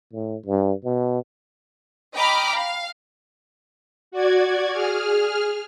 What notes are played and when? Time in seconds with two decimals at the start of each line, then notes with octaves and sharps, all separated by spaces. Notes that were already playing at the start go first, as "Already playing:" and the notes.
0.13 A2
0.46 G2
0.84 B2
2.14 D#5 G5 A#5 B5 D6 F6
2.54 F5
4.12 F#4 D5 G#6
4.72 G#4 F6